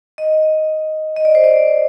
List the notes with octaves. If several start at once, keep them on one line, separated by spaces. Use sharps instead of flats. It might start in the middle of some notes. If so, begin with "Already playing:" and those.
D#5
D#5
D5
C5
D5